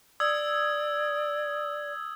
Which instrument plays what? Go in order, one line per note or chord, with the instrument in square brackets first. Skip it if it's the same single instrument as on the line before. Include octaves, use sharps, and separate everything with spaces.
[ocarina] D5 [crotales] D#6 E6 G#6